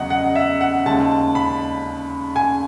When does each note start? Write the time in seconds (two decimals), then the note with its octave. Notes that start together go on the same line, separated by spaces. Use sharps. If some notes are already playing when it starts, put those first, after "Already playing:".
Already playing: E2 C#3 F#3 D#5 F#5
0.10 F#5
0.35 E5
0.61 F#5
0.86 D#2 C#3 G#3 A5
1.35 B5
2.36 G#5